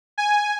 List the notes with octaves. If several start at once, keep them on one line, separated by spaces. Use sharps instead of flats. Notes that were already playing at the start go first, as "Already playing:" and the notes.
G#5